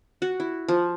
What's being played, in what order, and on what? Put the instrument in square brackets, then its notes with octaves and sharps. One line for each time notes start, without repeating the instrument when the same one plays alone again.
[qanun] F#4
E4
F3